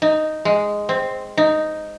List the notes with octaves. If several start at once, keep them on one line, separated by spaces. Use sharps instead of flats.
D#4
G#3
C4
D#4